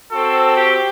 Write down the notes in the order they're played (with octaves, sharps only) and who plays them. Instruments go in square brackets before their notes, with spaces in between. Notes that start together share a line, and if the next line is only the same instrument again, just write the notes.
[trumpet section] C4 F#4 A4
G4